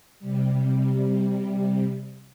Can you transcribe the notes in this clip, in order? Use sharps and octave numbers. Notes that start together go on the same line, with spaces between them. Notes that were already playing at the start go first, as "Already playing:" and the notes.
C3 G3